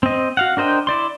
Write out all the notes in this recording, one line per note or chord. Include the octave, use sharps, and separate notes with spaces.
C4 D#5
F#4 F5 F#5
D4 A#4 C5 D#5 G5
E4 D5 C6